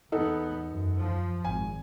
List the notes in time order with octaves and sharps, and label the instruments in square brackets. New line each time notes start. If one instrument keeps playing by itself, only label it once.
[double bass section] E2 B3 [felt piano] D#4 A4 F#5
[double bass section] F#2
F3
[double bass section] G#1 [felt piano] G#5